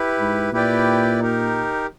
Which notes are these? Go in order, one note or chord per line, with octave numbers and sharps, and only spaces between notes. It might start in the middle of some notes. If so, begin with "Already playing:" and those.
Already playing: E4 G4 B4
G#2
A#2 E4 G4 B4 D5 G5
D#4 G4 A#4